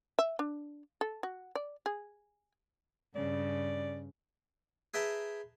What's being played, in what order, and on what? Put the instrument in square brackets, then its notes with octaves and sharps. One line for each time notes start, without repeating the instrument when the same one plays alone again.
[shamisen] E5
D4
A4
F#4
D5
G#4
[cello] G2 C#3 [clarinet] D5
[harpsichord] G#4 B4 E5 G5 A5 A#5